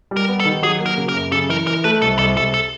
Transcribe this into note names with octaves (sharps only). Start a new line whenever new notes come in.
G3
A#4
B3
A4
D#3
F#3 G#4
A#3
A#4
C#3
A#4
F#2
C#3 A4
E3 A#4
E3 A#4
A3 B4
C2 A4
C2 A4
C2 A4
A4